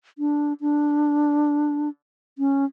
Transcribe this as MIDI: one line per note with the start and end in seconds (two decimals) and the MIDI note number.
0.18 0.53 62
0.61 1.89 62
2.38 2.65 61